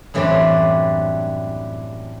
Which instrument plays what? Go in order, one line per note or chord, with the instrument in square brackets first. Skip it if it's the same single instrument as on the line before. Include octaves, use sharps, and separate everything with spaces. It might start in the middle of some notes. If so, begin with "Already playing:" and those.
[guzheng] F#2 A2 E3 G3 C4 D4